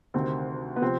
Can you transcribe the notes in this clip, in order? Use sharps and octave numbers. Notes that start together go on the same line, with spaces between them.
D2 C3 D#3 C4
B3
C3 F3 C4